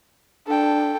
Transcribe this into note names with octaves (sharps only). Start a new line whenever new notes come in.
D4 A4 G5